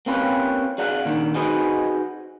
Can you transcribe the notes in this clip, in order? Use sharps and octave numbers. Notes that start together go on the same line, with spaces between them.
A#3 C4 C#4 F4 G4 B4
G#4 D5 F5 F#5
A#2 D#3 D4
D#4 F#4 G#4 B4 C5 D#5